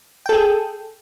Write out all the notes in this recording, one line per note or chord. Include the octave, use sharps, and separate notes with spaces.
G#4 A4 G5